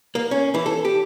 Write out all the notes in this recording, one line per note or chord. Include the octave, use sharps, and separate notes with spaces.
A#3
C#4
E3
A4
G4